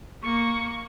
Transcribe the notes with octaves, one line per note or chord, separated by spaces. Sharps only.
A#3 C#6